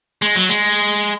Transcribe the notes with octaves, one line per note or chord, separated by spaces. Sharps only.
G#3
F#3
G#3